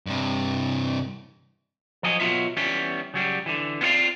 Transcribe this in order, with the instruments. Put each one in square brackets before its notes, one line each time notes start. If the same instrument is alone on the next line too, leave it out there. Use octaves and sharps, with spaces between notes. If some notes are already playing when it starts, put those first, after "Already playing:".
[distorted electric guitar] G2 C3
[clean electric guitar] F3 F#3 D#5 G#5
B2 F#3 C#4 D#4 F4 E5
E3 G3 B3 C#4
C#3 F#3 G3
D3 E3
B3 C4 F4 C#5 D5 F5